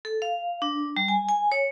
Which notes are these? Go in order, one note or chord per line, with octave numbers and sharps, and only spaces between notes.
A4
F5
D4
G3
G#5
G#5
C#5